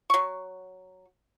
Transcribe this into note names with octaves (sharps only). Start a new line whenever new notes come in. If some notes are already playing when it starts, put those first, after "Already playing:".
F#3 C#6